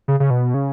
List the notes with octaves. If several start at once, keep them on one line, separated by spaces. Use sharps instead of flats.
C#3
C#3
B2
C#3